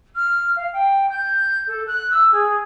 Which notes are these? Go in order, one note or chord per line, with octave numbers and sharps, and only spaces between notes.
F6
F5
G5
G6
A4
F#6
E6
G#4